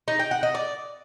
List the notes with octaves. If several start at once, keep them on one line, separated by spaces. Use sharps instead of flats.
D#4
G5
F#5
D#5
D5